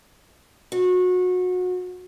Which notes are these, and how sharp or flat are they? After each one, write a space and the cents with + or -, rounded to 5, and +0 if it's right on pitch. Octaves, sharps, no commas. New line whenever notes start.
F#4 -25